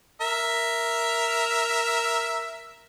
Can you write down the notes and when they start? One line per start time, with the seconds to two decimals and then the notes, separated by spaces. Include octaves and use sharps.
0.21 A#4 E5